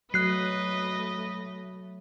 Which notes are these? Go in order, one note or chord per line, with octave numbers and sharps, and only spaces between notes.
F#3 A3 B4 D#5 F#6 C7